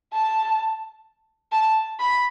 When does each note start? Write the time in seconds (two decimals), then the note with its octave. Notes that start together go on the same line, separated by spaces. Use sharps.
0.13 A5
1.52 A5
1.99 B5